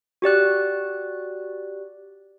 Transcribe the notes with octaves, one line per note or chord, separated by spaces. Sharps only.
F#4 G4 D5 F#6